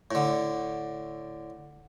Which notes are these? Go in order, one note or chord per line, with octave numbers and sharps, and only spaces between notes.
A2 D3